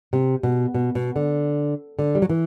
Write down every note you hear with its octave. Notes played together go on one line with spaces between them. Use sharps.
C3
B2
B2
B2
D3
D3
G3
F#3
E3